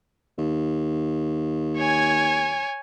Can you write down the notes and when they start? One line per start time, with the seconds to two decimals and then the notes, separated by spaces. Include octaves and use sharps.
0.38 D#2
1.78 C#5 G#5